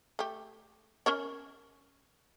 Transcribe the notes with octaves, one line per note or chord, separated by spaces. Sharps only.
A3 G4
C#4 A#4 C#5